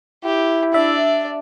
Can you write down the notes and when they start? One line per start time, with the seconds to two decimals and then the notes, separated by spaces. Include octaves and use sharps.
0.24 E4 G4
0.74 D4 D5 E5